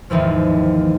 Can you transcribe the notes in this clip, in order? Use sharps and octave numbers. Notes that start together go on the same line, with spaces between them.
G#1 D#2 E3 F3